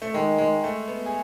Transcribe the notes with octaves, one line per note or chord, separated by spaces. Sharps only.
A3
D#3 G#3
G#3
A3
B3
G#4